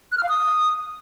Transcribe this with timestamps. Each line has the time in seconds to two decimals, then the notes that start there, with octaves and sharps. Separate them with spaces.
0.12 F#6
0.18 F6
0.23 F5
0.29 D#6